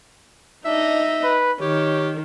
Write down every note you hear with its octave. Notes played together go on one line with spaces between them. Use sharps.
D4 D#4 D#5 E5
B4
D#3 G4 C#5